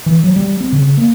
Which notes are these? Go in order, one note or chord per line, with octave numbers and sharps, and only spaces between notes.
E3
F#3
G3
C4
C#3
A#3